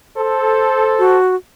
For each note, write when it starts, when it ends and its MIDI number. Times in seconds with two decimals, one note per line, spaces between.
0.17 1.17 69
0.17 1.17 72
0.99 1.35 66